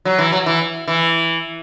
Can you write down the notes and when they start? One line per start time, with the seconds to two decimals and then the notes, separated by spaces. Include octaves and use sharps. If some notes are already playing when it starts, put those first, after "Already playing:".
0.05 F#3
0.18 E3
0.32 F#3
0.46 E3
0.88 E3